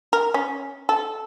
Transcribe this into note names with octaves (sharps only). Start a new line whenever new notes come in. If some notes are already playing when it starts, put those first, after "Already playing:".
A#4
C#4
A4